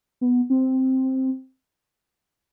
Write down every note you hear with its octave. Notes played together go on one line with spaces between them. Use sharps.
B3
C4